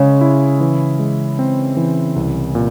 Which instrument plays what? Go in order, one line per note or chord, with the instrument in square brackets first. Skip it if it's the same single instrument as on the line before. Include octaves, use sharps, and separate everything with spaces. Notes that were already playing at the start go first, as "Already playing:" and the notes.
Already playing: [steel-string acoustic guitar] C#3 [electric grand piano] G#3 C#4
[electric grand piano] E4
E3
G#3
C4
E3
C2
A#2